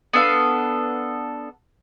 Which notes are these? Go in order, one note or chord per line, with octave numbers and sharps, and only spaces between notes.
B3 D4 A4 F5